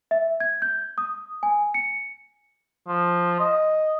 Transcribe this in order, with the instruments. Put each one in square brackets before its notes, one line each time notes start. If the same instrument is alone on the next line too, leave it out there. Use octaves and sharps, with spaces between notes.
[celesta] E5
G#6
G6
D#6
G#5
C#7
[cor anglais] F3
D#5